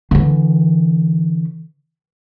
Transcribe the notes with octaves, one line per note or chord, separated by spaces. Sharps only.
D3 E3